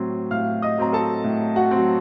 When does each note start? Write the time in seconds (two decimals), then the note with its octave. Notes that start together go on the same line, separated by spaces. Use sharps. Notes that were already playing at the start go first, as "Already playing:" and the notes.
Already playing: A2 F#3 C4
0.31 A2 F5 F6
0.62 D#5 D#6
0.78 F#3 C4 A#5
0.93 A4 A5
1.24 A2
1.56 F#4 F#5
1.71 F#3 C4